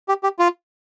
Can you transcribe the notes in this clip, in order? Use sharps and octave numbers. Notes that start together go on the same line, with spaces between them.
G4
G4
F4